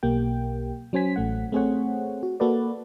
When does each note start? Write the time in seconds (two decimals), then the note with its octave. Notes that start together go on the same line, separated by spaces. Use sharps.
0.03 B1 A#3 G4 G5
0.93 F#3 C#4 C5 G#5 B6
1.16 A1 A3 F#5
1.52 A3 C4 G#4 C5 C#5 F#5
2.23 F#4
2.40 A#3 F#4 A4 B4 D5